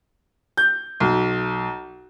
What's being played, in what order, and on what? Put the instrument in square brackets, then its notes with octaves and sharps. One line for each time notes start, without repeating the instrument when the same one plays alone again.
[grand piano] G6
B1